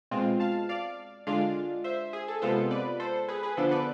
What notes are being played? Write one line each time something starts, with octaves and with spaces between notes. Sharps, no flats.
B2 G#3 C4 F4
F5 A5
D5 F5
D3 G#3 D4 F4 D5 F5
C5 E5
G#4
A4
C3 G#3 B3 F4 A4 C5
B4 D5
A4 C5
G#4 B4
G#4 B4
D3 F3 B3 D4 A4 C5
B4 D5